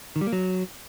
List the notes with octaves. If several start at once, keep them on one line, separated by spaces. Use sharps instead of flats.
D#3
G3
A#3
F#3